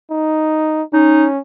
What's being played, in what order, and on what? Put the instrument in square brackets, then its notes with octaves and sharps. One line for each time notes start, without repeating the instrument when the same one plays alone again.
[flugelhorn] D#4
[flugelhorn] C#4 [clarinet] D#4